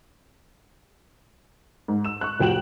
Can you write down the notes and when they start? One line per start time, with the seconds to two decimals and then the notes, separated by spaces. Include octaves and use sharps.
1.88 G#2
2.04 E6 E7
2.21 C#6 F#6
2.40 F1 F3 F#4 G5 E7 F#7